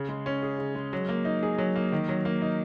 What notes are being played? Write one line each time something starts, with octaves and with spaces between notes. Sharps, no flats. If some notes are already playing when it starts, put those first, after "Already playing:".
Already playing: C#3
G#3
C#4
G#4
C#3
G#3
F#3
A#3
D#4
G#4
F#3
A#3
D#3
F#3
A#3
D#4